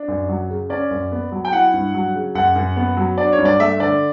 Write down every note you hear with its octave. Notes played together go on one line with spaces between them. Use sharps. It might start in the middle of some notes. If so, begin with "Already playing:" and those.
Already playing: D4
F#2
F#3
C#3
C#4 D5
F#2
B3
F#3
G5
E4 F#5
G2
F#3
C#3
F#2 F#5
F#2
B3
F#3
D4 D5
C#5
G2
D5
A3 E5
D3 D5